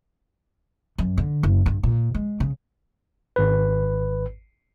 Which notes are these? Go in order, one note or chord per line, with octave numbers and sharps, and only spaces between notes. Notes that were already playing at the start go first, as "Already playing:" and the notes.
F#2
D3
F#1
G2
A#2
G#3
C#3
G#1 B4